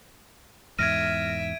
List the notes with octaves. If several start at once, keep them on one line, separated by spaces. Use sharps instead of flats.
E2 G#2 E5 F6 G#6 A#6 D7 D#7